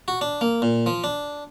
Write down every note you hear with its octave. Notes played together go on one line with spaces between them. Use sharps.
F#4
D4
A#3
A#2
F3
D4